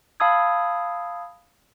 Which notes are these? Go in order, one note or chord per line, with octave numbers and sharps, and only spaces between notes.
F5 A5 B5 D#6 E6 G#6